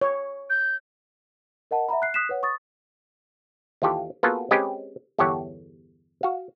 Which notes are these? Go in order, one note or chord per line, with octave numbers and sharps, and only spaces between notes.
C#5
G6
A#4 D#5 F#5 A5
E5 F#5 A#5 B5
F#6 C7
D#6 F#6 B6 C7 E7
B4 C#5 F#5
C#6 D#6 A6
D#2 E3 F4 G4 A4
A#3 B3 F4 F#4 G#4 A4
G#3 C4 C#4 G4 B4 D#5
G1 E2 G4 A4 C#5 F#5
F#4 F5